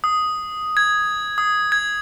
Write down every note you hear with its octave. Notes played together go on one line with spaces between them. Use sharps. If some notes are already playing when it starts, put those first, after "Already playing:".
D#6
G#6
D#6
G#6